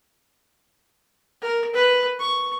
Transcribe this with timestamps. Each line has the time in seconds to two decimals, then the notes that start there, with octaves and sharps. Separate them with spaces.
1.41 A#4
1.74 B4
2.19 C#6